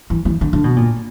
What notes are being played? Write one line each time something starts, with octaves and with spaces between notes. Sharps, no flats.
E3
E3
D3
D3
B2
A#2